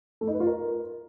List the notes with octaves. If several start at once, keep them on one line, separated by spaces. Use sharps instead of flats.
A3
D#4
B4
F4
A#4